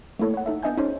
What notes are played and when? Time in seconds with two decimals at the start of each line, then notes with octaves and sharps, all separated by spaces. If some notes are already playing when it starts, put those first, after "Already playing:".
0.19 A3 A#3 E4 A4 C#5
0.34 C#5 F#5
0.46 D#4 A4 E5
0.63 B3 D4 D#5 E5 G#5 G6
0.77 C#4 D#4 G#4 C5 C#5